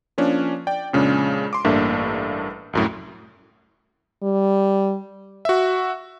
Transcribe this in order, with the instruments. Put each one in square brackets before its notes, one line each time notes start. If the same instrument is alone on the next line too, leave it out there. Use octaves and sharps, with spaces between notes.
[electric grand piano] F3 A#3 C#4 D4
D5 G5
F2 A#2 C#3 G#3 C#4 D4
C6 D6
A1 G2 A#3 D4 A4 E5
C2 F#2 A2
[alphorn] G3
[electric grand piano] F#4 E5